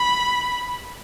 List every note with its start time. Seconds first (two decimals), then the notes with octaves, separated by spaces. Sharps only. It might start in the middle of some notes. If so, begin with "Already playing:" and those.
Already playing: B5